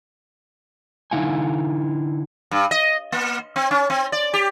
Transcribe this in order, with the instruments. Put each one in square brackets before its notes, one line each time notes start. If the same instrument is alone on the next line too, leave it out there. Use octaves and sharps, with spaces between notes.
[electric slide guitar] D3 D#4 E4 F5 F#5 G#5
[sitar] G2
D#5
A#3
C4
C#4
C4
D5
G4